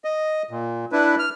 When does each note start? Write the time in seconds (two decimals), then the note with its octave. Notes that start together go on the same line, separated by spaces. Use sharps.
0.05 D#5
0.51 A#2
0.92 D4 E4 B4
1.19 F6